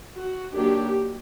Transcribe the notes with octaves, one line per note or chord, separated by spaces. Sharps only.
F#4
D#3 F#3 A#3 D4 G4